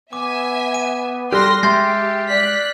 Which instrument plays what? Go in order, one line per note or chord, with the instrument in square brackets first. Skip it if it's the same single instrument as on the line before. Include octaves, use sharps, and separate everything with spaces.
[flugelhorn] B3 [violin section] E5 G#5 [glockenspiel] D6
[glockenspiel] D#7
[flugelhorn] G3 [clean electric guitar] G4 A4 [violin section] C6 A#6 [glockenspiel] F6 F#6
[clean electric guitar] G#3 C6 [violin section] G4 [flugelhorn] E5 [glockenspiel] G6 A6 C7
[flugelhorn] D5 [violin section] F#6 B6